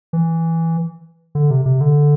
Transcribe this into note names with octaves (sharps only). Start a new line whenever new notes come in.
E3
D3
C3
C3
D3